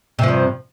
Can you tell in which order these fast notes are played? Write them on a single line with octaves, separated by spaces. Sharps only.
C3 F3 G2